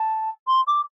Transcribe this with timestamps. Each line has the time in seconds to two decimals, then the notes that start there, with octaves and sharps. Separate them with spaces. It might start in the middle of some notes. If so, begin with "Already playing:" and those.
Already playing: A5
0.47 C6
0.67 D6